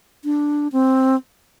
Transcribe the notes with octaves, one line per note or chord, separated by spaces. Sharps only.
D4
C4